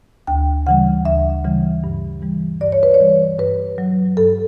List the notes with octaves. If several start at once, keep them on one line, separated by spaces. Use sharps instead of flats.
D2 G5
C#3 E3 G3 F#5
D2 E5
C#3 E3 G3
G2
E3 G3
G2 D5
C#5
B4
C#5
E3 G3
G2 B4
F#3
G2 A4